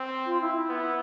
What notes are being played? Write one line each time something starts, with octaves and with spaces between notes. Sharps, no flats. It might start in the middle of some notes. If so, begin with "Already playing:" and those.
Already playing: C4
F4
E4
E4
B3